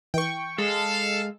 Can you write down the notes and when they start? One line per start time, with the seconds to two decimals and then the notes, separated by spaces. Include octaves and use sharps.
0.14 E3 G5 C#6
0.58 G#3 A4 F5